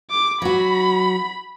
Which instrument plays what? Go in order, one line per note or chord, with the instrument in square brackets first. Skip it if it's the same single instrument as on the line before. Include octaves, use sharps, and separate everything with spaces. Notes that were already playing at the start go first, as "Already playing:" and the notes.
[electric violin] D6
[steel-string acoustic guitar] F#3 F#4 [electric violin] B5